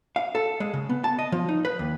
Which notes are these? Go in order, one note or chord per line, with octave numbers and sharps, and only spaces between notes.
F5
A4
G#3
C#3
B3
A5
D#5
F3
D#4
B4
D#2